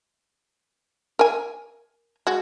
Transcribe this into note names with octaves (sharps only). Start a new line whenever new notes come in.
A#4 G#5
G#3 F#4